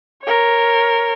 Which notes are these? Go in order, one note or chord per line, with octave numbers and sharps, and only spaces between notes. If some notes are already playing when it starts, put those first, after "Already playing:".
A#4 C#5